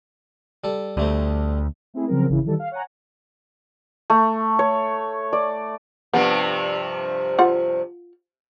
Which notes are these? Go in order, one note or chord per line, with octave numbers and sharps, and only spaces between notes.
G3 A4
D2 G3 A3 C4
A3 C4 E4 G#4
C#3 F3 F#3 C4 A#4
G#1 C#3 E3 E4
D#3 E3 G3 A4
F5
C#5 F#5 G#5 A#5
A3
C#5
D5
G2 C3 F3 B3
F4 F#5